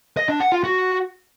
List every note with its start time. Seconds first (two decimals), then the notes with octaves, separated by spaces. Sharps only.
0.17 D#5
0.29 D4
0.40 F#5
0.52 F4
0.64 F#4